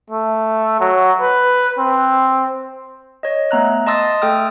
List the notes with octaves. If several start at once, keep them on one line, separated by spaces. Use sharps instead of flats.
A3
F#3
B4
C4
C#5 D#5
A3 B3 A#5 F#6
D#5 A5 C6 D#6 E6 A6
A3 A4 G5 D#6 F6